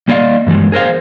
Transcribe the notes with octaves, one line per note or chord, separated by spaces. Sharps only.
G3 A#3 D5 D#5 F5
G2 E3 G3 G#3
G#4 A#4 C5 F5